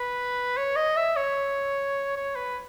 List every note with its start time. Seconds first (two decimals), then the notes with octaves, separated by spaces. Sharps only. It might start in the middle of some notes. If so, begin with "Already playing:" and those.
Already playing: B4
0.57 C#5
0.76 D#5
0.96 E5
1.16 C#5
2.16 C#5
2.36 B4